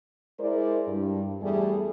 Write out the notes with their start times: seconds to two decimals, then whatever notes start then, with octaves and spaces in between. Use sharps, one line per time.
0.40 G#3 E4 A#4 C5 D5
0.88 G2
1.42 E2 G3 A3 E4 G#4 A4